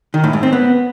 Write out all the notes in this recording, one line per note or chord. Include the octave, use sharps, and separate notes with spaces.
D#3
A2
G#2
C4
B3